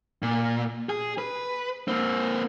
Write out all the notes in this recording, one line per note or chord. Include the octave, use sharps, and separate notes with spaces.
A#2
G#4
B4
A#3 C4